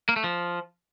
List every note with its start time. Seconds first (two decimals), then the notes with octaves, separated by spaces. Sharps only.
0.09 A#3
0.16 A3
0.24 F3